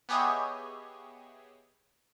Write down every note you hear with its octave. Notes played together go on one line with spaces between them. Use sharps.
B3 G4 G#4 C#5 D#5 E5